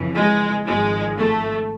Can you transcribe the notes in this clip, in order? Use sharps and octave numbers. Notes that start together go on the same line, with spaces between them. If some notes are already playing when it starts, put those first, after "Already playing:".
Already playing: F2 C#3 E3
G#3
G#1 G#2 F3 G#3
A3